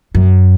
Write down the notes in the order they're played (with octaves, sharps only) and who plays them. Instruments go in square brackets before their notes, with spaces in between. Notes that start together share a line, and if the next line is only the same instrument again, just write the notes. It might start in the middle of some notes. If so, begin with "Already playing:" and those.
[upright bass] F#2